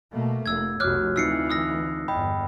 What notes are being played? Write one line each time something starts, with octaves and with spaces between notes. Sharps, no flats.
B2 A3 A#3
F1 A#3 E6 G#6
F1 B1 B2 F#4 C#5 D6 F6 F#6
D2 E3 C4 D#4 F4 E6 C7 C#7
D#6 E6 A#6
G1 E2 D#5 G5 B5